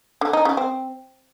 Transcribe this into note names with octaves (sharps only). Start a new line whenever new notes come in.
D3
D#4
C#3
C4